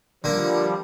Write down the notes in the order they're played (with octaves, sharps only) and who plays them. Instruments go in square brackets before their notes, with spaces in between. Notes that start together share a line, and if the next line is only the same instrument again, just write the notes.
[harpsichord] D3 A#3 [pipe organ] F3 G3